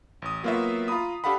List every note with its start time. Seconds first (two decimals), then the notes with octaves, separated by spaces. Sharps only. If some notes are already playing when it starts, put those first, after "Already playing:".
0.22 A1 D#6
0.43 F#3 A#3 B3 F4 F#4 E5
0.88 F4 A#5 B5 D#6
1.24 D4 G4 A4 F5 F#5 B5